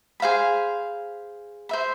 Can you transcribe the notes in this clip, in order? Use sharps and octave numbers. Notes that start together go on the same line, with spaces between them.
G#4 C5 F5 B5
C5 E5 B5